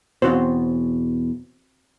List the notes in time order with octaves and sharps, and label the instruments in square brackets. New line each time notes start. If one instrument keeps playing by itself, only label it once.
[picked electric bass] E2 B2 [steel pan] C4 F#4 C5